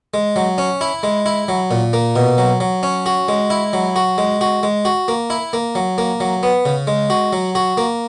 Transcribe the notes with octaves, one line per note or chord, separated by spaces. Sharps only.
G#3
F#3
C#4
E4
G#3
E4
F#3
A#2
A#3
B2
F#3
F#3
C#4
F#4
G#3
E4
F#3
F#4
G#3
F#4
G#3
F#4
A#3
E4
A#3
F#3
A#3
F#3
B3
C#3
G#3
F#4
F#3
F#4
A#3